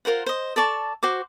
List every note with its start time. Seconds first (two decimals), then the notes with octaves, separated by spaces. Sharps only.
0.05 F4 A#4 C5 F#5
0.26 C5 D#5
0.56 A4 D5 A5 C#6
1.03 F#4 C5 D6